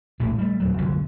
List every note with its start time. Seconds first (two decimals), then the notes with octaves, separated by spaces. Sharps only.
0.20 A#1 A2 G#3
0.39 G3 A3
0.60 D#1 F#3
0.78 C2 F#2 D3 F3